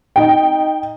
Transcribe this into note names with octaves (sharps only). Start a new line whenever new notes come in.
D#4 G5